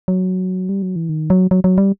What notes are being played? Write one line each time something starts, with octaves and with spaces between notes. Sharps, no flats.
F#3
G3
F#3
E3
D#3
F#3
F#3
F#3
G3